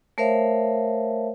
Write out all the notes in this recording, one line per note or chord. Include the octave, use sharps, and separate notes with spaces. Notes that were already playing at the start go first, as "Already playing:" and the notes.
A3 A#4 C5 C#5 E5 F5